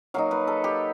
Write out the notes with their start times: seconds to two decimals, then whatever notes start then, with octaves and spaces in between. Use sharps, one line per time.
0.14 F#3 A#3 D#4 F5
0.31 B4
0.47 A4
0.64 G4